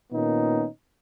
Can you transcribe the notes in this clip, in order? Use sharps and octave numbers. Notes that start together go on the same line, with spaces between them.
A#2 D#3 A#3 B3 C#4 D#4